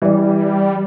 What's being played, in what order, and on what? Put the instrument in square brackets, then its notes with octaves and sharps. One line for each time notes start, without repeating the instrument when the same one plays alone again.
[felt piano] E3 D5 [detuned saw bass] G3